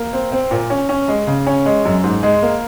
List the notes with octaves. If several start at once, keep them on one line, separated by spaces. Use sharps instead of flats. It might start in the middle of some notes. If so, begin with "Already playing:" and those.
Already playing: A#3
C4
C4
A#2
C#4
C#4
G#3
C#3
C#4
G#3
F#2
G#2
G#3
A#3